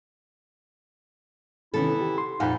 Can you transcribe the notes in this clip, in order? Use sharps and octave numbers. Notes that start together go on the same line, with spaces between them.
C3 D#3 E3 B3 C#4 E4 A4
G4
C6
F2 A#2 D#4 F5 F#5 G#5 B5